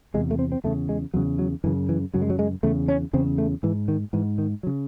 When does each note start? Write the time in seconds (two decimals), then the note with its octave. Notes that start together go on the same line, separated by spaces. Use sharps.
0.14 E2 C3 G#3
0.31 A3
0.39 C4
0.52 C4
0.64 E2 C#3 A3
0.89 G#3
1.14 E2 C#3 F#3
1.39 F#3
1.64 F#2 E3
1.66 C#3
1.89 E3
2.14 F#2 C#3 F#3
2.22 G#3
2.30 F#3
2.39 G#3
2.63 E2 C#3 A3
2.88 C#4
3.13 E2 C#3 C4
3.38 A3
3.63 G#2 E3
3.88 D#3
4.13 G#2 E3
4.38 D#3
4.63 F#3
4.67 C#3